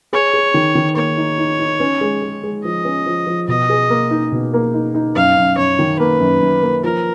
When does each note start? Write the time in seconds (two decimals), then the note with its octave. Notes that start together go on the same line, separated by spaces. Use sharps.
0.13 G#4 C#5
0.33 G#4
0.54 D#3
0.75 D#3
0.96 A#3 C#5
1.18 D#4
1.38 D#4
1.59 D#4
1.80 C#4
2.01 G#3
2.22 G#3
2.43 G#3
2.64 F3 D#5
2.85 C#4
3.06 F3
3.27 F3
3.48 B2 D#5
3.69 G#4
3.90 A#3
4.11 D#4
4.32 B2
4.54 A#3
4.74 D#4
4.95 D#4
5.15 F#2 F5
5.37 F#2
5.58 F#2 C#5
5.79 D#3
5.99 A#3 B4
6.20 F#2
6.41 F#2
6.63 A#3
6.84 F3 A#4